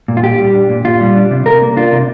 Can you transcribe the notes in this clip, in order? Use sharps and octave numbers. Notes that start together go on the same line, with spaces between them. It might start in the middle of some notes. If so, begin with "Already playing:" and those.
A#2
F4
A#2 G4
G3
D4
A#2
A#2 F4
G3
D4
C3
C3 A#4
A#3
D4 F4
C3